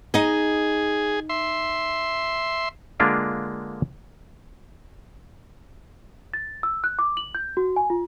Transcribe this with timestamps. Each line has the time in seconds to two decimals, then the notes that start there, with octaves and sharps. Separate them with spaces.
0.14 D#4 G#4 D#5
1.29 E5 C6
3.00 D3 G#3 A#3 D4 F4 D5
6.34 A6
6.63 E6
6.84 F#6
6.99 D6
7.17 F#7
7.35 G6
7.57 F#4
7.76 G#5
7.90 F4